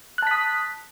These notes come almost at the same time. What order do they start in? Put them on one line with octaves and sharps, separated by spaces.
F#6 A5 B6 D#6